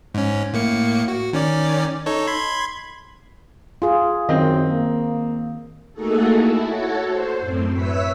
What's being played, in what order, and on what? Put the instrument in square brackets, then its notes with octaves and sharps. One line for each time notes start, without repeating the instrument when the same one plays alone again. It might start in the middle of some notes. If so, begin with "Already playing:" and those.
[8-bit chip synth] G#2 C#4
A2 A#3 C#7
F#4
D#3 C#4 D5
D#4 A4 C#5
B5 C6 G#6
[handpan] F4 G#4
[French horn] F#2 [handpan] D#3 [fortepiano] C4 D#5
[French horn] A#3
[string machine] A3 A#3 D#4 F#4 G#4 A4
E4
F#4 A4 C#5
C5
F#2 A2 C4
B4 C#5 E5 E6 B6